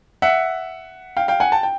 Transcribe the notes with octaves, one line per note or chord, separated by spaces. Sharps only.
E5 F#5
F5 G5
F5 G5
F#5 G#5
G5 A5
G5